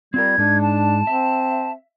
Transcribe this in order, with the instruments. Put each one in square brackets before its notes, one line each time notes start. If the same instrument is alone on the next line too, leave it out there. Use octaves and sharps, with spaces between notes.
[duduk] G3 [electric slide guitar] C4 F4 A#4 [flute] G#6
[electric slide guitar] G#2 G#3 D#4 [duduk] D4
[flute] A5
[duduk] C4 [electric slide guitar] E5